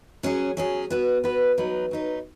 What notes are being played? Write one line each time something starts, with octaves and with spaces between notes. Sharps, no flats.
F#3 C#4 G#4
F#3 C#4 G#4
B3 F#4 B4
B3 F#4 B4
F#3 D#4 B4
F#3 D#4 B4